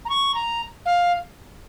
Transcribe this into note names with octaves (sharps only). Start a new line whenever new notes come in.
A#5
C#6
A#5
F5